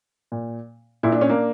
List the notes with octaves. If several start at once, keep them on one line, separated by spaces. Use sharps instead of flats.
A#2
A#2 E4
D4
C#4
A#3 D4